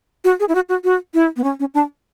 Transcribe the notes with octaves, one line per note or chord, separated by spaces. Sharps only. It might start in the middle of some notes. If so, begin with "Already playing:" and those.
F#4
G#4
E4
F#4
F#4
F#4
E4
B3
C#4
C#4
D4